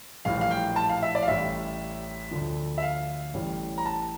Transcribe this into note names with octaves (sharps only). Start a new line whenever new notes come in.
A#1 A2 E3 G3 F5
F5
G5
A5
F5
E5
D5
F5
A1 A2 G3 E5
D2 D3 F3
E5
F5
A1 A2 E3 G3
A#5
A5